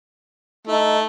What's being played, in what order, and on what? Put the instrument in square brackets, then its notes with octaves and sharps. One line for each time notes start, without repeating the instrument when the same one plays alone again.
[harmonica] A3 [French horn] D#4